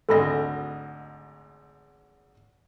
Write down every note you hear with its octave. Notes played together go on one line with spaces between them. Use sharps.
G#1 D2 A4 D#5 B5 A#6